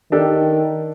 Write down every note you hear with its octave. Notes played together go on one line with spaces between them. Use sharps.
D#3 D4 G4 A4